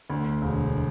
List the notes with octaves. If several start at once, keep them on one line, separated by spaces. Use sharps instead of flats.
D2
E1